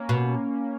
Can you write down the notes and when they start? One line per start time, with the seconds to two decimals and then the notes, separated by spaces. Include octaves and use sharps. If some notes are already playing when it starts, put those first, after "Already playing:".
Already playing: A#3 C#4
0.09 B2